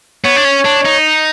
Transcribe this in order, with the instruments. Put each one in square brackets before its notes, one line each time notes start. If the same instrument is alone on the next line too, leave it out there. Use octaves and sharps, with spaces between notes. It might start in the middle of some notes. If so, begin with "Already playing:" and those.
[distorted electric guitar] B3 [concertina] C#5
[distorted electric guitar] D4
C#4
D4
D#4